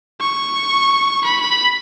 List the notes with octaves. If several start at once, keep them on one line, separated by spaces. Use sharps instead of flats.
C#6
B5